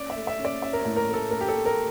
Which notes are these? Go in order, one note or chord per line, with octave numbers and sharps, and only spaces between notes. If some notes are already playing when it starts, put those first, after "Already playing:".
Already playing: C#4 D5
E5
A3
E5
C#4
D5
C#4 E5
A#4
C#5
A2
A#4
A3
A4
A3 A#4
G4
A4
A3
A#4